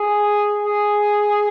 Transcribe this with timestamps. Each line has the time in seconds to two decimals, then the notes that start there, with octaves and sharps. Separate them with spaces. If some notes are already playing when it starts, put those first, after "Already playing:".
Already playing: G#4
0.63 G#4